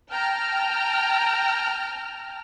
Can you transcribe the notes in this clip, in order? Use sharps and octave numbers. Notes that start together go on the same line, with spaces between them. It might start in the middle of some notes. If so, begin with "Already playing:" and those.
G5 A5 A#5 F6